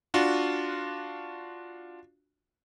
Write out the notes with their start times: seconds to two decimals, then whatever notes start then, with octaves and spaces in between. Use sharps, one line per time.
0.14 D4 F4 F#4